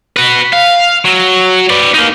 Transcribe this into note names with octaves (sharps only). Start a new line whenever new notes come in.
F#4 B4
F5
F#3
B4 D5
A#3 D#4